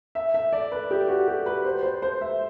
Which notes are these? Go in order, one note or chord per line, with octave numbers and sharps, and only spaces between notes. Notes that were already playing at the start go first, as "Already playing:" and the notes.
E5
E5
D5
B4
G4
F#4
G4
B4
C5
C5
C5
E5